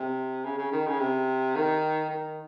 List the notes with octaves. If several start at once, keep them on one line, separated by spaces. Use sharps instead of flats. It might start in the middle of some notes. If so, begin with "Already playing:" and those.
Already playing: C3
C#3
C#3
D#3
C#3
C3
D#3
D#3